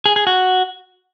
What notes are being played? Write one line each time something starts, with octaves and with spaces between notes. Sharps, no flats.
G#4
G#4
F#4